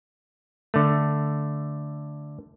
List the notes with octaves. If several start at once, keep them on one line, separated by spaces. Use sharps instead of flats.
D3 A3